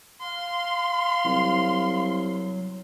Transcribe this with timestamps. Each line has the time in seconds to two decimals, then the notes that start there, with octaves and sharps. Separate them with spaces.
0.22 F5 C6
1.25 C2 F#3